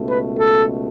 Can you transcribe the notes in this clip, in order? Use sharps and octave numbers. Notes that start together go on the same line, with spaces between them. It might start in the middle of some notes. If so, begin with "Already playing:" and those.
Already playing: C#2 B2 A3
B4
A4